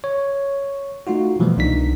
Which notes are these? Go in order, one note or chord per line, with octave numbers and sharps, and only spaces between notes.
C#5
A3 D#4 F4 F#4
B2 E3 F3 G3 A3 B3
C2 D4 D#4 B6